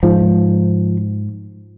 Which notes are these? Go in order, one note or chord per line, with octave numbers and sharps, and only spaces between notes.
G#2 F3